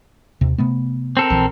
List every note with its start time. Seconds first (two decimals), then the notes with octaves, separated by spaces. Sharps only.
0.41 D#2 C3
0.58 C3 A3 B3
1.17 C4 A4 A#4
1.30 A#1 E3